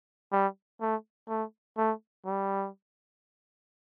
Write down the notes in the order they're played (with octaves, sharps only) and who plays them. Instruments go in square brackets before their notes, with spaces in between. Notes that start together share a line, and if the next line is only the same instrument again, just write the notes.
[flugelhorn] G3
A3
A3
A3
G3